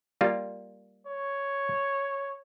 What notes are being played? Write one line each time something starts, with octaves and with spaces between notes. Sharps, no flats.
G3 A#3 F4
C#5